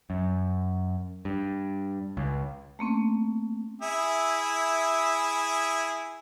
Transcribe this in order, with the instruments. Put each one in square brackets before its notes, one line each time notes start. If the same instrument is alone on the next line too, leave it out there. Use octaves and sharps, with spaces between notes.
[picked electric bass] F#2
G2
C#2
[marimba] A3 A#3 C4 C#4
[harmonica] E4 G#4 E5